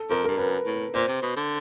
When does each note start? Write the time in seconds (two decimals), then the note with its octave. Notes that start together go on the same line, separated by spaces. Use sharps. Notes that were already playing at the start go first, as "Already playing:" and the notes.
Already playing: A4
0.10 F2 A#4
0.25 G2 A#4
0.38 F#2 B4
0.66 A2
0.94 A#2 C5
1.08 C3
1.22 B2
1.36 D3